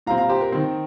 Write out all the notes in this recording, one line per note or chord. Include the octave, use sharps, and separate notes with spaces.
A#2 G3 C4 F5 A#5
F5 A#5
G4 C5
A#4
D#3 C4